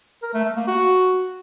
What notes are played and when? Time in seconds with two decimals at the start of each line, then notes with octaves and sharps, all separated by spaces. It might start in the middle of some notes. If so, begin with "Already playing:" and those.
0.23 A#4
0.34 A3
0.45 A3
0.56 A#3
0.67 F#4